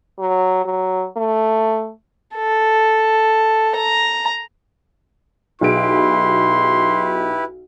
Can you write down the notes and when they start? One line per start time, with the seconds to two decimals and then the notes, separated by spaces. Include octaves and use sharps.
0.19 F#3
0.65 F#3
1.17 A3
2.36 A4
3.76 A#5
5.61 B1 E4 G4 G#4 B4 C6 D7